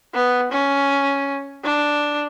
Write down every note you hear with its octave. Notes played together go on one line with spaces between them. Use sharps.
B3
C#4
D4